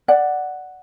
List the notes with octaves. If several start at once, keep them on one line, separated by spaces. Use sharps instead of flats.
D5 F#5